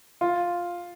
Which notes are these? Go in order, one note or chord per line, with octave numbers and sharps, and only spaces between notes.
F4